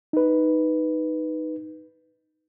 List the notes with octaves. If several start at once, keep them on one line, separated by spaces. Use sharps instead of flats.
D#4 B4